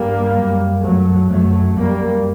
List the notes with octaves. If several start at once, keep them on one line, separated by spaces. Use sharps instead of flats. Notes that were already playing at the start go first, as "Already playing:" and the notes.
Already playing: G2 G3 A#3
F#2
F#2 F#3 A3
F#2 F#3 A3
F#2 G3 A#3